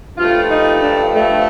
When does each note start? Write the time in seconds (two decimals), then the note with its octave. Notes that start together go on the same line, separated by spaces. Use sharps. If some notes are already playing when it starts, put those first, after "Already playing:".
0.18 G2 F3 A3 F4
0.49 D#4
0.80 D4
1.12 A3